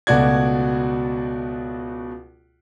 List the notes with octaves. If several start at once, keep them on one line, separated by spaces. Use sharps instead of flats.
C#2 B2 A3 F#4 D5 G#6